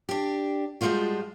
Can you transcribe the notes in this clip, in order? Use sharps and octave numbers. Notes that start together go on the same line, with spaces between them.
D4 G4
F3 G3 G#3 C4 F4 F#4